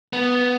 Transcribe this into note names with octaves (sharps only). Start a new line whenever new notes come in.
B3